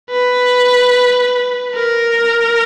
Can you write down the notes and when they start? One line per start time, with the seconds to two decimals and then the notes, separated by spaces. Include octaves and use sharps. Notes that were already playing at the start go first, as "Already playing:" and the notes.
0.10 B4
1.75 A#4